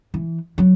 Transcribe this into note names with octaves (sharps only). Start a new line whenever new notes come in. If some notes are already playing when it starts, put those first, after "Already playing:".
E3
F#3